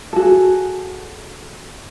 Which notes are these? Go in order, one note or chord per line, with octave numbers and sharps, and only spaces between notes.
F#4 G#4 A4